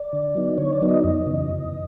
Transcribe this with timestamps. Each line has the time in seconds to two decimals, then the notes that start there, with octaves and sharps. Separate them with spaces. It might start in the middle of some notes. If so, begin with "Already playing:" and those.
Already playing: D5
0.13 D3
0.35 F#3 B3 D#4
0.58 D3 C#5
0.73 D5
0.82 F#3 B3 D#4
0.89 D#5
1.03 F2 D#5
1.26 C#3 E3
1.50 F2